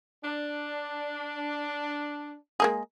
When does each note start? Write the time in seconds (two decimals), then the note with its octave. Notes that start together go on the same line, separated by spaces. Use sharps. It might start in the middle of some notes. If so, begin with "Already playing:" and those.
0.23 D4
2.60 G#3 A#3 G#4